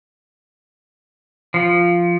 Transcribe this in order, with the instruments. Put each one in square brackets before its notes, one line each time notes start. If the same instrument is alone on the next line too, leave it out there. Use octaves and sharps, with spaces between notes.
[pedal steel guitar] F3